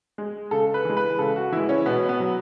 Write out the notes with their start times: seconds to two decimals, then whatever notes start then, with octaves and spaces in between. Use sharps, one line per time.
0.18 G#3
0.51 C#3 A4
0.74 B4
0.85 E3 G#3
0.97 B4
1.19 C#3 A4
1.36 F#4
1.52 E3 G#3 E4
1.69 C#4
1.86 B2 B3
2.09 B3
2.20 F#3